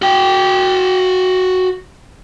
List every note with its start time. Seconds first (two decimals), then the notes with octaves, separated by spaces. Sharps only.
0.02 F#4 G5